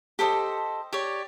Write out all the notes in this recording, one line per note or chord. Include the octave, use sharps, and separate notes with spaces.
G4 A4 C5 D#5
G4 C#5 D5